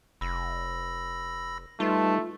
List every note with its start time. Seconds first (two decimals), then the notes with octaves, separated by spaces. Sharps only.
0.21 F1 B5 E6 A#6
1.80 G3 A3 D#4 F4 B4 A5